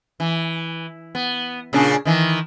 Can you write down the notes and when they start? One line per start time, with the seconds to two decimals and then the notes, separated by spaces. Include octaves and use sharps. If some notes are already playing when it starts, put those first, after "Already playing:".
0.20 E3
1.15 B3
1.73 A#2 C#3 D4
2.05 D#3 E3